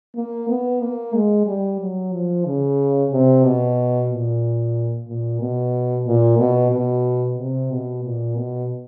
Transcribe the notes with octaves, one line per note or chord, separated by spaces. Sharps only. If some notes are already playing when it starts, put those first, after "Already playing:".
A#3
B3
A#3
G#3
G3
F#3
F3
C#3
C3
B2
A#2
A#2
B2
A#2
B2
B2
C3
B2
A#2
B2